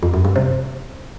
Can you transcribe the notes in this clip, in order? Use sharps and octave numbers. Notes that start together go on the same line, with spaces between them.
F2
F#2
G2
C3